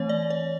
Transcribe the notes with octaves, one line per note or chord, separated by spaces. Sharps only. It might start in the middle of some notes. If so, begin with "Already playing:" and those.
Already playing: E3 A3 C4 C#5
D5
C#5